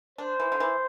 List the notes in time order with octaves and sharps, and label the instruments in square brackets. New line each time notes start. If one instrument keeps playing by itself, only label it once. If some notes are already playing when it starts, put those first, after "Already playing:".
[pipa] D4 [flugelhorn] C5
[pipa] E3
D3
E3